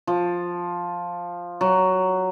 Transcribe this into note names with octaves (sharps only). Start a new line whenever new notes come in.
F3
F#3